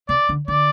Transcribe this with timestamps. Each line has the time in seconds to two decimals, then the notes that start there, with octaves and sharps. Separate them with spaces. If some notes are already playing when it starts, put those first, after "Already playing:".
0.09 C3 D5
0.29 D3
0.48 D3 D5